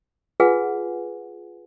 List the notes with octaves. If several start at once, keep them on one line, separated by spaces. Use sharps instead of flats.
F4 G#4 B4 F#5 G#5